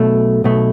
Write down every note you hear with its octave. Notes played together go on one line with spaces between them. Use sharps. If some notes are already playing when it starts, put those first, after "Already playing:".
Already playing: B1 B2 A3
B1 B2 A3